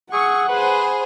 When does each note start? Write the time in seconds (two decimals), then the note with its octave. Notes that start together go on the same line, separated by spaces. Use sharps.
0.13 G#4 F#5 C#6 E6
0.48 G#4 B4 C5 B5